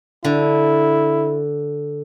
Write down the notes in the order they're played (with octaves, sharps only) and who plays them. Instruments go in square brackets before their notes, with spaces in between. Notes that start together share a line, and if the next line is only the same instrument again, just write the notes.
[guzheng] D3 [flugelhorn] E4